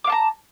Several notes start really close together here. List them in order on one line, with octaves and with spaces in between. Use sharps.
D6 F5 A5 A#5